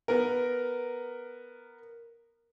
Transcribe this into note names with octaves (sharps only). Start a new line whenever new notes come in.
B3 A#4